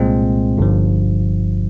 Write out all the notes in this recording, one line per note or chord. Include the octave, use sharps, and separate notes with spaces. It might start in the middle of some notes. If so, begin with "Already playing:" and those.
Already playing: C2 A#2 G#3 C4
G1 G2 F3